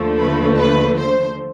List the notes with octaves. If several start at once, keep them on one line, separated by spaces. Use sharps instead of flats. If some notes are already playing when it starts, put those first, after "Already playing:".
Already playing: D#2 D3 F3 A3
B4
B4
C5